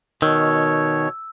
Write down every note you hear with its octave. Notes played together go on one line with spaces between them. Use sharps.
B2 D#3 C#5 E6